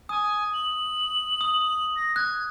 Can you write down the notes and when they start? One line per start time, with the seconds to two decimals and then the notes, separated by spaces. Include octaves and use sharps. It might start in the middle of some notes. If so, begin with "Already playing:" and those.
0.09 G#5 D#6
0.54 F#7
1.41 D#6
1.96 A#6
2.16 F#6 G#6